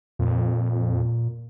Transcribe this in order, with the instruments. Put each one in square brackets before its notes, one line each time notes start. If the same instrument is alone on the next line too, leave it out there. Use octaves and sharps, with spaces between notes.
[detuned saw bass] F2 [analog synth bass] A#2